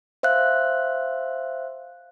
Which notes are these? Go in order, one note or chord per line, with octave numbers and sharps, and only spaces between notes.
C5 E5 F5 F#6